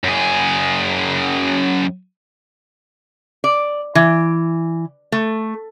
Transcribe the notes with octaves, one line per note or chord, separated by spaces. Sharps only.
F#2 G#4
D5
E3
A3